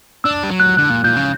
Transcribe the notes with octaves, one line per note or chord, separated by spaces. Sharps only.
D4 E6
G3
F#3
F#6
D3 F#6
A#2
A#2 G6
C#3